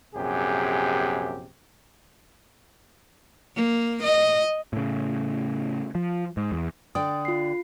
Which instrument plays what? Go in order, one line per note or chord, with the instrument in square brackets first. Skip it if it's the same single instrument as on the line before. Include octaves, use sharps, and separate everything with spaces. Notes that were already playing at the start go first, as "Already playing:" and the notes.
[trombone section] A#1 F#2 C3 G4 G#4
[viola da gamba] A#3
D#5
[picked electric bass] A2 C#3
F3
G#2
E2
[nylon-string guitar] D3 D5 G5 [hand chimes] D#6
[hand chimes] F4 C7